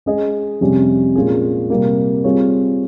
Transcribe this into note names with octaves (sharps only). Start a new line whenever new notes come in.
G#3 C#4 G#4 D#5
F2 C3 G3 C#4 G4
A#2 G#3 C#4 F4 G#4
C3 G3 A#3
G3 C4 F4 G#4 C#5